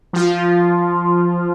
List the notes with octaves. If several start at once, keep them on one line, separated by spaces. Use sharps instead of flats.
F3 F4